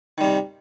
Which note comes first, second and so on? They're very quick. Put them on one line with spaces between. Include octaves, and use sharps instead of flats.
D#3 G3 C3